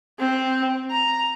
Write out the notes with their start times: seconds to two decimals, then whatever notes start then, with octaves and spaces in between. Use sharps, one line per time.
0.19 C4
0.91 A#5